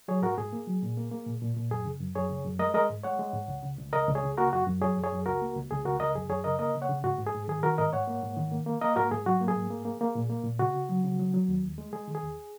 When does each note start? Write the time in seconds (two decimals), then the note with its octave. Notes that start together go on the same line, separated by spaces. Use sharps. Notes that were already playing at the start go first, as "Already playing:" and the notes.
0.08 F#3 G#4 C#5
0.22 G#2 F#4 A#4
0.37 G#2 G#4
0.53 A#3
0.67 F#3
0.83 A#2
0.97 A#3
1.11 A#3
1.26 A#2
1.42 A#2
1.57 A#2
1.71 F#2 G#4
1.85 C#3
2.00 F#2
2.15 F#2 G#4 C#5
2.30 C#3
2.45 F#2
2.59 G#3 A#4 D#5
2.74 G#3 A#4 D#5
2.90 G#2
3.04 G#3 C#5 F#5
3.19 G#3
3.33 G#2
3.48 C#2
3.63 C#3
3.78 C#2
3.93 C#2 A#4 D#5
4.08 C#2
4.15 G#4 C#5
4.23 C#3
4.37 A#3 F#4 A#4
4.53 F#2 F#4
4.67 F#2
4.81 F#3 G#4 C#5
4.97 F#2
5.04 G#4 C#5
5.12 F#2
5.26 C#2 F#4 A#4
5.42 A#3
5.56 C#2
5.71 C#2 G#4
5.85 C#2 F#4 A#4
6.00 C#2 A#4 D#5
6.15 F#2 G#4
6.30 F#2 G#4 C#5
6.44 C#3 A#4 D#5
6.59 A#3 A#4 D#5
6.75 C#3
6.82 C#5 F#5
6.89 C#3
7.04 G#2 F#4
7.18 G#2
7.27 G#4
7.34 G#2
7.48 D#3 G#4
7.63 D#3 F#4 A#4
7.78 G#2 A#4 D#5
7.93 G#2 C#5 F#5
8.08 A#3
8.23 G#2
8.37 D#3
8.52 A#3
8.66 A#3
8.82 A#3 A#4 D#5
8.96 G#2 F#4 A#4
9.11 G#2 G#4
9.26 F#3 F#4
9.41 A#3
9.48 G#4
9.56 G#2
9.70 A#3
9.85 A#3
10.01 A#3
10.15 A#2
10.30 A#3
10.44 A#2
10.59 C#3 F#4
10.74 C#3
10.89 F#3
11.04 C#3
11.19 F#3
11.34 F#3
11.48 D#2
11.63 D#2
11.78 G#3
11.93 G#3 G#4
12.08 D#3
12.15 G#4
12.23 D#2